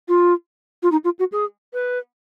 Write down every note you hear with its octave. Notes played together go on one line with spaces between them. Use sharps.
F4
F4
D#4
F4
F#4
G#4
B4